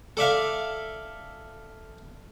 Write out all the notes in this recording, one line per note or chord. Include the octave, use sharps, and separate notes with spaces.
A4 D5 E5 F5